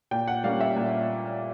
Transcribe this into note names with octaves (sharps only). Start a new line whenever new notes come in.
A#2 G5
F#5
G3 A#3 C#4 F5
E5
A#2